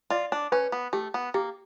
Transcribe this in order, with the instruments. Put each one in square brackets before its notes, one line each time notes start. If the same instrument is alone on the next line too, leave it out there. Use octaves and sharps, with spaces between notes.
[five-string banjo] F4 [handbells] D5
[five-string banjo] D4
[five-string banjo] C#4 [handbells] B4
[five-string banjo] B3
[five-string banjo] A3 [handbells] G4
[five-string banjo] B3
[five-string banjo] A#3 [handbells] G4